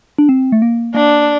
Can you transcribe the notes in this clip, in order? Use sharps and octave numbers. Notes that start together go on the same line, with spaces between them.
D4
C4
A3
A#3
A#3 D4